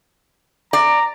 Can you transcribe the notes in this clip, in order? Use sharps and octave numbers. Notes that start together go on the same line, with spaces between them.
D5 A#5